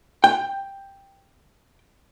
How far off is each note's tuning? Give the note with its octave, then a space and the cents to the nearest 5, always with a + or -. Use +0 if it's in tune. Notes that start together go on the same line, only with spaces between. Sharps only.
G5 +10